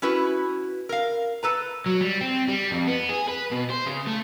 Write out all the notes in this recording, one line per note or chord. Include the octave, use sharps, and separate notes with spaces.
C#4 E4 F#4 B4
A#4 F5
A4 B4 A#5
F#3
G3
C4
G3
F2
B3
G#4
B4
B2
C5
C#3
A3